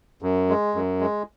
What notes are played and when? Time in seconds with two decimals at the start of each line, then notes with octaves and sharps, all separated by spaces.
0.22 F#2
0.49 G#3
0.75 F#2
1.01 G#3